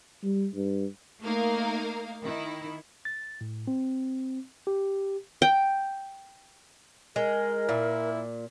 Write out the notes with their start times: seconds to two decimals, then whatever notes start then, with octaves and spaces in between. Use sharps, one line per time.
0.23 G3
0.55 G2
1.22 A3 A#3 D#4 A#4 F5
2.23 D#3 E4
3.05 A6
3.41 A2
3.67 C4
4.67 G4
5.42 G5
7.16 G#3 A#4
7.69 A#2 E4